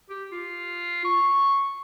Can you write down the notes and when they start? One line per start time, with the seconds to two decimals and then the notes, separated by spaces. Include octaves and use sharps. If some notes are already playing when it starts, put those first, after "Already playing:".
0.10 G4
0.32 F4
1.05 C#6